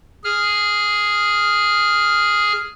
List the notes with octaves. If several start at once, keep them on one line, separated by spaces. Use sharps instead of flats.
G#4 F6